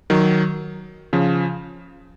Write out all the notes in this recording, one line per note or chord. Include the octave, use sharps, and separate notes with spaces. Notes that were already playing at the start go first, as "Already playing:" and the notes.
D#3 F#3
C#3 F3